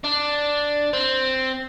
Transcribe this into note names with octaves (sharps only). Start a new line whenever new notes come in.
D4
C4